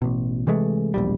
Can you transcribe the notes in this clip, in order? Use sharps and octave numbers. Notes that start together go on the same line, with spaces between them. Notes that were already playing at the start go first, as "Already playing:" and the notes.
A1 B2
C3 E3 G#3 A3
E1 A#1 G3